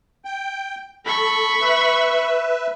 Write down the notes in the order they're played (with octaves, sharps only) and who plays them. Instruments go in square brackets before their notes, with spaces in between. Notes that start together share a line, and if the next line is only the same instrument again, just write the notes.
[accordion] G5
[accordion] A4 [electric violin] B5 C#6
[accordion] B4 E5